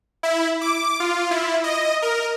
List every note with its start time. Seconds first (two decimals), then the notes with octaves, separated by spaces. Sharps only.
0.23 E4
0.61 D6
1.00 F4
1.31 E4
1.64 D#5
2.02 A#4